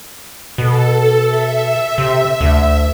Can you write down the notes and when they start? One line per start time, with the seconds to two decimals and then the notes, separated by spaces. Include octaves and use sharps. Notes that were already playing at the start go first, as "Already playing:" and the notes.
0.58 B2 A4
1.26 E5
1.98 C3
2.41 D2